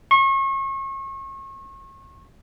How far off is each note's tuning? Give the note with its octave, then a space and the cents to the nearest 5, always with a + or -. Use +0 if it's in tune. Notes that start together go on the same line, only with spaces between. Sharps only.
C#6 -35